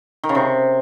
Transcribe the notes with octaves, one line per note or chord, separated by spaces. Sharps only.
D#3
C#3
C3